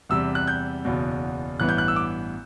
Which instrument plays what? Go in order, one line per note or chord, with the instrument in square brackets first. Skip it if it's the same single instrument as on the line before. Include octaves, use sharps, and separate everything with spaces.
[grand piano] E2 C3 G3 E6
F#6
G6
F#1 E2 B2
A1 G2 E3 B3 F#6
G6
F#6
E6
D6